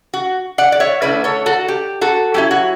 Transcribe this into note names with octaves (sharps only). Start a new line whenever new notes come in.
F#4
D5 F#5
D5
C#5 E5
D3 A3 C#4 E4 B4 D5
A4 C#5
F#4 A4
G4
F#4 A4
F#3 C#4 E4 G4
F#4